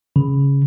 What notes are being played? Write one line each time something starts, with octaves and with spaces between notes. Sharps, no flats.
C#3